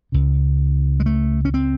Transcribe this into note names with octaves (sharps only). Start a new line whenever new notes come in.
C#2 C#3
G#3
A3
C#4
C4